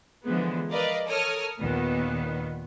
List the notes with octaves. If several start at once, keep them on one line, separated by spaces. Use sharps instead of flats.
D3 E3 F3 G#3 B3
A#4 B4 D5 D#5 F5
A4 A#4 C#5 D#6 F6
D#2 A#2 D#3 B3